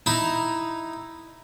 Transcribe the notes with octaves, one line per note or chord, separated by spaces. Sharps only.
D#4 E4